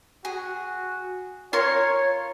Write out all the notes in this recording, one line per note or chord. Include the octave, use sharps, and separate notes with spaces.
F#4 G#4
F4 A#4 C#5 C6